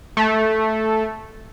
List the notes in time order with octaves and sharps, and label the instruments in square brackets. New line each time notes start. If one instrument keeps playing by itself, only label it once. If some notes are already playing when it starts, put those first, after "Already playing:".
[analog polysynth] A3